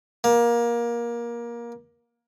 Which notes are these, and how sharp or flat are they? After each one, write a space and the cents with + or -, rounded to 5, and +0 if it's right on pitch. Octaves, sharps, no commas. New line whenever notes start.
A#3 +20